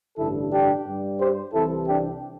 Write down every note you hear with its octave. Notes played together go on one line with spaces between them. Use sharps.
A1 G2 D3 E4 A4
D4 G4
G2 G3
G4 C5
C2 C3 E3 E4 A4
D4 G4